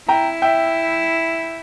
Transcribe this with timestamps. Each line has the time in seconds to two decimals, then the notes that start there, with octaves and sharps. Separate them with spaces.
0.08 E4 G5 A#5
0.42 E5 G5